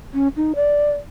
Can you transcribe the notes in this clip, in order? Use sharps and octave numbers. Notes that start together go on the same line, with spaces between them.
C#4
D#4
D5